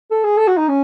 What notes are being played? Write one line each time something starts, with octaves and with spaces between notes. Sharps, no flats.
A4
G#4
A4
F#4
D#4
C#4